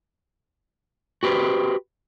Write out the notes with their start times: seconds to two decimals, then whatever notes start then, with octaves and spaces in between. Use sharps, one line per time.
1.23 F#4 G4 B4 C5